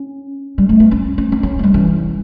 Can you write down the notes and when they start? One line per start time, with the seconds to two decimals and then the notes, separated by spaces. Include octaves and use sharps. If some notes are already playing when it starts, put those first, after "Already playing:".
Already playing: C#4
0.58 G3
0.69 A3
0.80 B3
0.91 C#4
1.18 C#4
1.32 C#4
1.43 C#4
1.59 A3
1.63 G3
1.74 E3